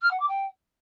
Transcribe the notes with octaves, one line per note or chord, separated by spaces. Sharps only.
F6
F#5
D6
G5